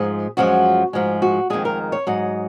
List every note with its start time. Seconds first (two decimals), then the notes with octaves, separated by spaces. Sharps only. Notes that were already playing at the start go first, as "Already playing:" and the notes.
Already playing: G#2 F3 G#3 G#4
0.37 F#2 F3 G#3 F#4
0.93 G#2 F3 G#3
1.22 F#4
1.50 F2 D#3 G#3 G#4
1.65 A#4
1.92 C#5
2.07 G#2 F#3 D#5